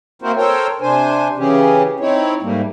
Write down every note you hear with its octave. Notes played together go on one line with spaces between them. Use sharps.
A#3 C4 E4 F#4 A#4 C5
A4 A#4 C5 C#5 G5
C3 D4 C5 G#5
C#3 E3 C#4 G4 G#4
C4 D#4 E4 C#5
G#2 G3 A3 A#3